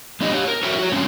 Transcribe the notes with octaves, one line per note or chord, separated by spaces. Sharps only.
G#3 A3 B3 D4 G4 D#5
G4 C#5
A#4
F#4 A4 A#4 C#5 E5 G5
F#4 C#5
D3 F#3 G#3 C4 C#4